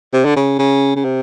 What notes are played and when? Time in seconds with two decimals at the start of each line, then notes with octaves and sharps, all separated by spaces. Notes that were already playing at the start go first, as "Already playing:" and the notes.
0.13 C3
0.25 D3
0.36 C#3
0.59 C#3
0.96 C#3
1.05 C3